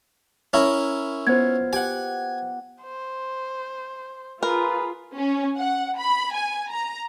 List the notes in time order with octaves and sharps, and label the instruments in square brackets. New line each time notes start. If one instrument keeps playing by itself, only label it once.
[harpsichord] C#4 E4 [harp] A#4 A#5
[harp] B3 F4 [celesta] C5 G#6
[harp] G4 F#5 [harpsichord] G#5
[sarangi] C5
[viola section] F4 [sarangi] G#4 [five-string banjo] A#4 [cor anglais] B4
[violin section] C#4
F#5
B5
G#5
A#5